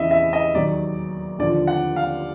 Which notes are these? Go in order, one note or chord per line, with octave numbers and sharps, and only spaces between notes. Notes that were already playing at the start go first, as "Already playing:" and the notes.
Already playing: E2 C#3 E3 D#5 E5
E5
D#5
D#2 D#3 F#3 D5
D#2 D3 F3 D5
F#5
F5